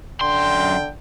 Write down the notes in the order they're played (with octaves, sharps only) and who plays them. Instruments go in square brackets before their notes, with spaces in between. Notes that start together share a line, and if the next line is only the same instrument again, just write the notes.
[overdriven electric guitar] F#2 C6 [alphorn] D3 [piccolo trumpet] G5